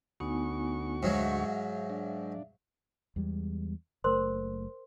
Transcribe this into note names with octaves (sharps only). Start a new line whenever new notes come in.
D2 B3 D#4 F#4 G#5 C#6
G#2 F#3 E5 F5
D4
E2 G3 G#3
F#1 A3 A#4 C5 C6